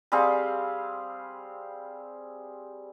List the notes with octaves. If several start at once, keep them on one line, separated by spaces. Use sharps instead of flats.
G3 C4 G#4 F5